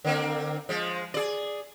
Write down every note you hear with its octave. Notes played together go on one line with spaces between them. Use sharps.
D3 A#3 C4
F3 G#3
G#4 D5